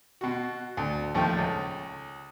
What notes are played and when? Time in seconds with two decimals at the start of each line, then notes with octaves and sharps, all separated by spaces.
0.21 B2 F#4
0.77 D2
1.15 D#2 F3 A3 G5
1.37 C#2